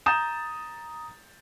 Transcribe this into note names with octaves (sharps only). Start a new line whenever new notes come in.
A#5 D#6 G6 A6 E7